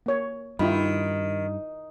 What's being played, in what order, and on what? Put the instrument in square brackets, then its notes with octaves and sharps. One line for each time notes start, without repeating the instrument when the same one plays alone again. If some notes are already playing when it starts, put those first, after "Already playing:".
[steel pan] A#3 C#5
[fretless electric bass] G2 [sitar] D#3 [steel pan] E4 F4 B5